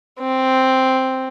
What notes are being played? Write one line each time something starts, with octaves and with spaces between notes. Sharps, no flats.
C4